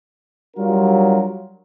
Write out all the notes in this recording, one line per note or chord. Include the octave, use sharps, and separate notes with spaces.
F#3 G3 D4 F4 A#4